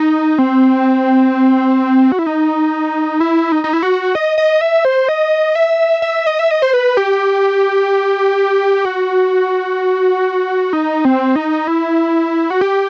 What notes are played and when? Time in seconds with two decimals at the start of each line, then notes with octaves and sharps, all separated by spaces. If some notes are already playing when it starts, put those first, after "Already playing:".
Already playing: D#4
0.38 C4
2.12 F#4
2.19 E4
2.26 D#4
3.20 E4
3.52 D#4
3.64 D#4
3.73 E4
3.83 F#4
4.15 D#5
4.38 D#5
4.61 E5
4.85 C5
5.09 D#5
5.55 E5
6.02 E5
6.26 D#5
6.39 E5
6.51 D#5
6.62 C5
6.73 B4
6.97 G4
8.85 F#4
10.73 D#4
11.05 C4
11.36 D#4
11.67 E4
12.50 F#4
12.61 G4